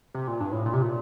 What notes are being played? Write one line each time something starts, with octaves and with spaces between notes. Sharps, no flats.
C3
A#2
G2
A2
A#2
C3
A#2